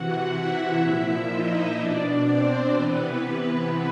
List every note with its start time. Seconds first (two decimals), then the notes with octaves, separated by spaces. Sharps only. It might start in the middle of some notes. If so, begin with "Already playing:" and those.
Already playing: C3 E3 F#4 F#5
0.32 E4 E5
0.81 A#2 F3 E4 E5
1.29 D#4 D#5
1.77 B2 D4 D5
2.26 C4 C5
2.73 C3 E3 B3 B4
3.22 B3 B4